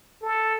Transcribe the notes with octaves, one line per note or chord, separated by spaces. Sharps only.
A4